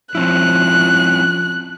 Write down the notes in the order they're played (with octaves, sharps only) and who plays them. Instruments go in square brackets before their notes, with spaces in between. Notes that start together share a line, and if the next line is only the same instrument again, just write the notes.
[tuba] F3 [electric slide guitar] C4 C#4 E4 [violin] F#6